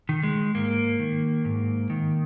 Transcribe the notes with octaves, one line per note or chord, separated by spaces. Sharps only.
D#3
G#3
G#2 A#3
D#3
G#2
D#3